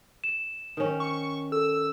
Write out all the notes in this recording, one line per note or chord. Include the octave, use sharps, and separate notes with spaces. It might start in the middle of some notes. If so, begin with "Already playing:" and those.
E7
D#3 C#4
C#6
A4 E6